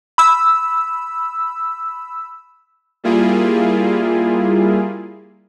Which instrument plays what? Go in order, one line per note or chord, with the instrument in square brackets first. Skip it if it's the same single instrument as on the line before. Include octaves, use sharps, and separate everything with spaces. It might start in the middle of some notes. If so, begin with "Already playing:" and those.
[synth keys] B5 E6
[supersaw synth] G3 A#3 E4 F4 G#4